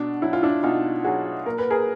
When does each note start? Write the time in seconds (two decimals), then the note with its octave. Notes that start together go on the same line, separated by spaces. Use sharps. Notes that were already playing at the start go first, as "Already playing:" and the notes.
Already playing: B2 D4
0.22 F#3 E4
0.33 F4
0.43 D4 E4
0.63 B2 D#4 F4
1.04 F#3 F#4 G#4
1.46 A#2 A#4
1.58 B4
1.70 G#4 A#4